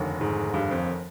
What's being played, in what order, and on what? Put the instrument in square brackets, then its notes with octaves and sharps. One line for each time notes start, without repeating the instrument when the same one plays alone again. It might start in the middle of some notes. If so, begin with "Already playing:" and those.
Already playing: [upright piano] F1 D#2 D3
[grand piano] G#2
G2
F2